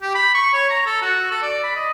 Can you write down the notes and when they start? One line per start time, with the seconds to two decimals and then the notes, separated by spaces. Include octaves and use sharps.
0.02 G4
0.15 B5
0.34 C#6
0.53 C#5
0.70 A#5
0.86 A4
1.02 F#4
1.31 A4
1.42 D5
1.63 B5
1.76 D#5